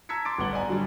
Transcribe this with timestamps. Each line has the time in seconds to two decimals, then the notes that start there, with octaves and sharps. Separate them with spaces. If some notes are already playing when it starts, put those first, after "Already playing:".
0.09 A5 A#5 E6 G#6 B6 C#7
0.25 C6 D6 A6 D7
0.38 G1 A2 B3 F#5 F#7 G7
0.53 D5 D#5 G#5 A#5
0.68 D3 F#3 G3